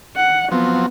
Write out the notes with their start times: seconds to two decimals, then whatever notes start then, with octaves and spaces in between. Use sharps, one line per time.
0.16 F#5
0.52 F3 F#3 B3 C4